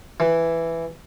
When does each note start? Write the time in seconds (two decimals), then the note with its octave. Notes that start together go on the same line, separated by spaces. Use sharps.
0.20 E3